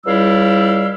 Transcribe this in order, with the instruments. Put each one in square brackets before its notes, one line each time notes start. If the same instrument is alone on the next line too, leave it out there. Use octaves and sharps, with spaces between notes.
[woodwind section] C#2 G3 E4 F5 E6